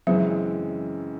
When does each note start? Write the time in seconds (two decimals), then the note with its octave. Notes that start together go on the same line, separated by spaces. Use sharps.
0.07 F#2 C#3 E3 F#3 G#3 C4